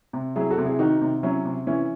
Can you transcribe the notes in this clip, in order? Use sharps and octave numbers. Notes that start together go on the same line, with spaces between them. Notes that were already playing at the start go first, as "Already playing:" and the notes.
C3
F#3 E4 G#4
F#4 A4
C3
E4 G#4
D#3 D#4 F#4
C3
F#3 C#4 E4
C3
E3 C#4 E4